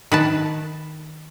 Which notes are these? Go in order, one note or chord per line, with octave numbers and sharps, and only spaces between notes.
D#3 B4 A5